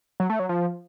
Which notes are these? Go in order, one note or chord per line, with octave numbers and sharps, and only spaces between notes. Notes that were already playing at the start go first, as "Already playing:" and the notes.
F#3
A3
F#3
F3